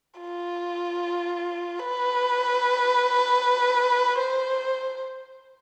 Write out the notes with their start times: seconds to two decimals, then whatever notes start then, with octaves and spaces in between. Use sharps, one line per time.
0.20 F4
1.79 B4
4.19 C5